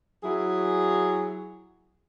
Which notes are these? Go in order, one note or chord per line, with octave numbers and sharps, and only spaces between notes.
F#3 E4 G#4